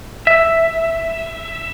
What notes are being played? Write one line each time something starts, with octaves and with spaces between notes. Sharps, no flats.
E5